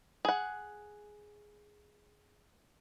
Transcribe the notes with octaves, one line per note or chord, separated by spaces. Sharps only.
G#4 F#5